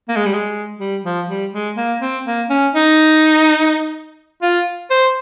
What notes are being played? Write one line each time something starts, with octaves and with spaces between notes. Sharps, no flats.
A#3
G#3
G3
G#3
G3
F3
G3
G#3
A#3
C4
A#3
C#4
D#4
F4
C5